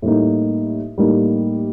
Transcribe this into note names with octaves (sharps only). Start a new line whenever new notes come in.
A2 G3 A#3 D#4
A2 G3 A#3 D#4